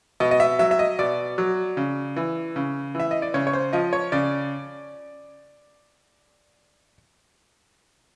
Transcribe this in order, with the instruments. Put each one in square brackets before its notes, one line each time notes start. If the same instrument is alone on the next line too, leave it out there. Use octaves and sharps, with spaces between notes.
[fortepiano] B2 D#5
D#5
E5
F#3 E5
E5
D#5
B2 D5
F#3
C#3
E3
C#3
E3 E5
D#5
D5
C#3 C#5
C#5
C5
F3 D#5
C#5
C#3 D5